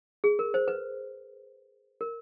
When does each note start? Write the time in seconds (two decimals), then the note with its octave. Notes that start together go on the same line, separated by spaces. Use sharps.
0.24 G#4
0.39 A#4
0.54 C5
0.68 B4
2.01 A#4